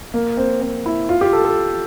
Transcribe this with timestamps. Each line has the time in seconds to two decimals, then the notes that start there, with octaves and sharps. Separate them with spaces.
0.14 A#3
0.37 C4
0.61 C4
0.86 E4
1.09 F4
1.21 G4
1.33 A4
1.45 A4